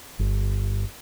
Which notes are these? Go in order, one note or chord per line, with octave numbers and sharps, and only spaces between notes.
G1